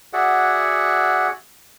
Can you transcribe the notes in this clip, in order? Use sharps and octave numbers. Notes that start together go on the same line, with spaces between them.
F#4 G#4 D5 E5 F#5